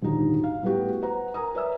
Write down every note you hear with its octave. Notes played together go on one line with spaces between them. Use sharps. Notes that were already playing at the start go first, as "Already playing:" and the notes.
D#1 G#1 D3 D#4 F#4
F5
A2 G3 B3 E4 F#4 G4
B4 C5 F#5 A#5
A#4 G#5 A#5 D#6
B4 C#5 D5 E5 G#5 E6